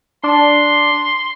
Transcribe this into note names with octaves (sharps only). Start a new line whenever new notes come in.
D4 C6